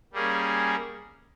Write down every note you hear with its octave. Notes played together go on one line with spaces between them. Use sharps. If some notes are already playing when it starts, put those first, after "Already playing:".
G3 A#3 C#4 G#4